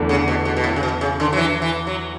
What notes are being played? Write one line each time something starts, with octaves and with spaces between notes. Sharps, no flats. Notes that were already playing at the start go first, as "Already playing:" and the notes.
Already playing: E2 D3 A3 D4
C#3
B2
B2
B2
A2
C#3
B2
C#3
D3
F#3
E3
E3
F#3